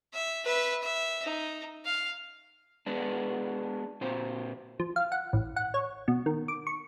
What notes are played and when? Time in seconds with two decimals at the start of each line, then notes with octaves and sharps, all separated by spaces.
0.13 E5
0.45 B4 E5
0.82 E5
1.23 D#4
1.85 F5
2.86 G#3 B3 D4
4.01 A#2 C4 C5
4.80 F3
4.96 F5
5.12 F#5
5.33 A1
5.56 F#5
5.74 C#5
6.08 B2
6.26 D#3
6.48 D6
6.67 C#6